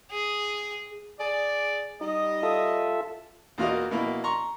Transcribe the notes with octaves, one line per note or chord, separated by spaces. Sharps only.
G#4
G#4 D5
G3 D#4 D#5
F4 A4 E5
E2 A#3 F4 F#4 A#4 D#5
B2 A#3 E4
A#5 C6 C#6